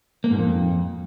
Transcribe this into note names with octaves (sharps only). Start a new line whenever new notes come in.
A#3
G#2
F2